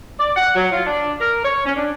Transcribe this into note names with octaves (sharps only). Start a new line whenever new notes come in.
D5
F#5
F#3
F4
D4
A#4
C#5
C#4
D4